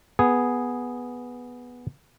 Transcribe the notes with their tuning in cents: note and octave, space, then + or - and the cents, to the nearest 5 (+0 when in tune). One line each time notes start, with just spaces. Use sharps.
B3 -5 G#4 +0